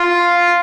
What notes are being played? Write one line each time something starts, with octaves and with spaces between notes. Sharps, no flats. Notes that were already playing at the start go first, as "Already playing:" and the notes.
Already playing: F4